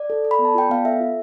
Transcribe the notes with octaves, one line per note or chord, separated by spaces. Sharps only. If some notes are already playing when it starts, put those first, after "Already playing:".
Already playing: D5
A4
A4
B5
B3
A5
F4 G5
B3 F5
A4 E5
F4